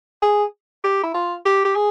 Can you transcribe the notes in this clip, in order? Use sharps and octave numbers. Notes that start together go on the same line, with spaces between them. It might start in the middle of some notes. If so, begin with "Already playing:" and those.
G#4
G4
E4
F4
G4
G4
G#4